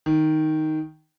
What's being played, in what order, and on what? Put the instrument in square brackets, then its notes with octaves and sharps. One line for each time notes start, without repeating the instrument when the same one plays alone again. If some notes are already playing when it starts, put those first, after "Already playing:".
[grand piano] D#3